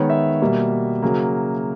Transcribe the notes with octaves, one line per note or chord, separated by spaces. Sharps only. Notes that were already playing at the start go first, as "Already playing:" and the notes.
Already playing: D#3 G#3 B3 C#5
E5
B2 G3 A#3
C#3 F#3 A#3